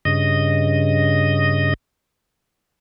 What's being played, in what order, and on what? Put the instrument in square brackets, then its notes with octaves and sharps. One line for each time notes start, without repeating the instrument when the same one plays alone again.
[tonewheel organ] G2 C#3 D#5